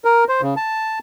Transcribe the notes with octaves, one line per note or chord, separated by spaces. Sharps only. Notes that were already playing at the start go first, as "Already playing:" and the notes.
A#4
C5
C#3
A5